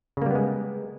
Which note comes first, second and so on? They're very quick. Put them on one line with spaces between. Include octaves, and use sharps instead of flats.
C#3 A#3 G3 B3 G#3